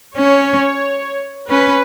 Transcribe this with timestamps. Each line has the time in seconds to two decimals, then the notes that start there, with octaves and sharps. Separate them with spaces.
0.16 C#4 C#5
1.50 C#4 B4